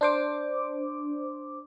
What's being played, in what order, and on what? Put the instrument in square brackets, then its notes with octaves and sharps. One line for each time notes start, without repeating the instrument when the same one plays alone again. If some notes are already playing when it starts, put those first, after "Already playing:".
[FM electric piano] D4 C5 D6